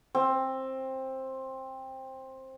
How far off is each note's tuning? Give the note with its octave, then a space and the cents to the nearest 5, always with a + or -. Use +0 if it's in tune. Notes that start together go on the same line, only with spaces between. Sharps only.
C4 +15